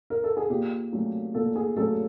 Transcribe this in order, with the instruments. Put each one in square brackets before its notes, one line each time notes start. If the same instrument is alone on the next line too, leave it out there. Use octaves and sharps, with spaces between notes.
[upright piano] A#4
A4
G#4
A#2 G4
F#3 A3 C#4
A#2 A4
G#4
F#3 A3 C#4 A4